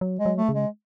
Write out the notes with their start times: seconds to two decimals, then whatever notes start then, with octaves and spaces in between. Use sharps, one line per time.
0.01 F#3
0.19 G#3
0.26 F#3
0.37 A3
0.49 C#3
0.55 G#3